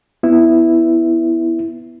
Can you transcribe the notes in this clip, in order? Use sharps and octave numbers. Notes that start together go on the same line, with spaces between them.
B3 E4